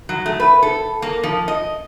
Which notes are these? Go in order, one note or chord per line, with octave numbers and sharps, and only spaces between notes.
F#3
A3
B4
A4
A#3
F3
D#5